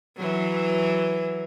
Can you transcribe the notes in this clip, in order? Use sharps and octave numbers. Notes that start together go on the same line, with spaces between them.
E3 F#3